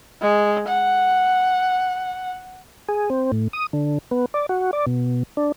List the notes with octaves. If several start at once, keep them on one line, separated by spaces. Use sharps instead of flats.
G#3
F#5
G#4
C4
A2
D#6
D3
B3
D5
F#4
D5
B2
D4